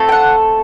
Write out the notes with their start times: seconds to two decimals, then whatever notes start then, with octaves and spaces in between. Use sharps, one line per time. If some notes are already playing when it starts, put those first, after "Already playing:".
Already playing: A3 C4 F4 A4
0.09 G5
0.12 F#5